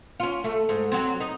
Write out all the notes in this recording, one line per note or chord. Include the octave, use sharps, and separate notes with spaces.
C#4 F4
A3
G#2
F#3 C4
D#4